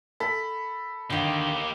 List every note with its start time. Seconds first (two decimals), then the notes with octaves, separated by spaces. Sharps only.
0.20 A4 B5
1.10 D3 D#3 A#3 G4